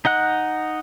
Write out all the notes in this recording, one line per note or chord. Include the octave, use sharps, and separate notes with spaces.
D#4 D#5 F#5 F#6